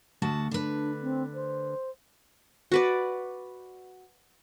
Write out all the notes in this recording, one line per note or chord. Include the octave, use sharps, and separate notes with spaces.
D2 F#4 A5
D3 D4 B4
C4
C5
F#4 B4 D5